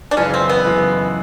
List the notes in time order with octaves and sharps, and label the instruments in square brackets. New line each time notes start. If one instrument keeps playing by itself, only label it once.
[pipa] D4
[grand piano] F#2 C#3 E3 G#3 [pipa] C#4
[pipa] C4
B3
[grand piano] F#2 C#3 E3 G#3